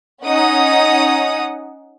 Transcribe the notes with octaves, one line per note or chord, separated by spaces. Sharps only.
C#4 D#4 F#5 D#6